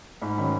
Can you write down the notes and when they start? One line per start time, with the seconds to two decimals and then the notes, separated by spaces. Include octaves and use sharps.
0.22 G#2 B5
0.38 D#3 F#3 C#4 B5